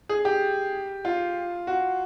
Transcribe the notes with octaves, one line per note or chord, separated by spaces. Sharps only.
G#4
G4
F4
F#4